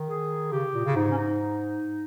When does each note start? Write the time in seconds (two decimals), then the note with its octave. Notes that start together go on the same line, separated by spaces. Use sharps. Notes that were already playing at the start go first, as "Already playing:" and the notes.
Already playing: D#3
0.10 G#4
0.52 C#3 G4
0.74 A#2
0.85 C#3
0.96 G#2 D#4
1.11 C#4
1.17 D#4